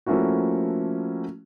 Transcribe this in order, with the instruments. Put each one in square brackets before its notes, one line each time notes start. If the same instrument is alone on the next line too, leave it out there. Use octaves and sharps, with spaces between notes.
[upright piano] F3 A3 A#3 C#4 E4 F#4